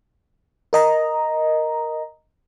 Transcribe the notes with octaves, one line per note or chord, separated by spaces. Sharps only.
A#4 D#5 A#5